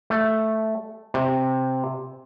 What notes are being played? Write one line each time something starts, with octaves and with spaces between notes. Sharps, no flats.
A3
C3